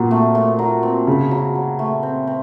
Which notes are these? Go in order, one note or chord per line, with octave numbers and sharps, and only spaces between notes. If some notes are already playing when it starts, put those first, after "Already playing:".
Already playing: A#2 F#3 C4
A3
A3
F#3
C4
C#3 F#3
F#3
F#3
A3
C4
C4